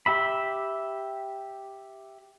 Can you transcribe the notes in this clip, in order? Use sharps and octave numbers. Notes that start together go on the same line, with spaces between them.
G4 E5 B5